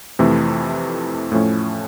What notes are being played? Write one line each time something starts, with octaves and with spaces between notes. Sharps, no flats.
F2 C3 E3 A3
A2 F3 A3 C#4